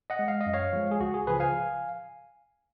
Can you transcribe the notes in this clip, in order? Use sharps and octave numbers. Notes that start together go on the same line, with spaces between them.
D#5 F#5
G#3
F5
D#5
F#2
C#5 F5
F3 G#3
G#4
C#2 F#4
G#4
C#3 F3 G#4 B4
F5 G#5